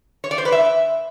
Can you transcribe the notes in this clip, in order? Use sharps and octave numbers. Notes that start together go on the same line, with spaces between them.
C#5
D5
C5
B4
E5